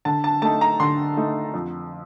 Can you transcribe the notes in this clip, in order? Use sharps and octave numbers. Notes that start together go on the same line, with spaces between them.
D3 A5
A5
A3 D#4 A5
A#5
D3 C6
A3 D#4
F2